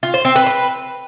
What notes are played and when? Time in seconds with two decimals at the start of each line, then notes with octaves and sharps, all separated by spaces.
0.03 F4
0.14 C5
0.25 C4
0.36 B4
0.47 B4